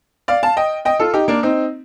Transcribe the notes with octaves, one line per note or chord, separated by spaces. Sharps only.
D5 F5
F5 A5
D#5 G5
D#5 G5
F4 A4
D#4 G4
A#3 D4
C4 D#4